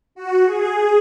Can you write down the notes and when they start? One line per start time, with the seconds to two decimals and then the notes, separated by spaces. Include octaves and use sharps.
0.15 F#4
0.45 G#4